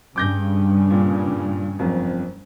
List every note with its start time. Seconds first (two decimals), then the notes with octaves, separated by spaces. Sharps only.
0.16 G2 C#3 D6 G6 A#6
0.90 A#2
1.79 F#1 F2